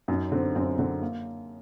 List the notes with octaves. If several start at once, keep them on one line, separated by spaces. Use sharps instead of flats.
F#2 D#4
D3 C4
F#2 C4
D3 C4
A#3